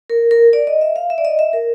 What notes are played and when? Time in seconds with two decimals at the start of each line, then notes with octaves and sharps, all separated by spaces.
0.10 A#4
0.31 A#4
0.53 D5
0.67 D#5
0.81 E5
0.96 F5
1.10 E5
1.18 D5
1.25 D#5
1.39 E5
1.53 A#4